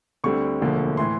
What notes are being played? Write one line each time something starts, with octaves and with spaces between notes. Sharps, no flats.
D2 D3 G3 C4 C#6
E1 D2 D3 F3 A#3
A2 E3 C6